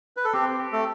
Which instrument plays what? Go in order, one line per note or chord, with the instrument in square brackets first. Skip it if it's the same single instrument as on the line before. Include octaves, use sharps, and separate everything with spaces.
[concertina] B4
A4
[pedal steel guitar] C4 [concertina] G4
[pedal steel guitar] G4
[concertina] A3 A4